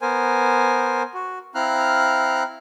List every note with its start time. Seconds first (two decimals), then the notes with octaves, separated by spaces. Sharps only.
0.02 B3 A#4 C5 G#5
1.14 F#4
1.55 C4 E4 F5 A#5 F6 F#6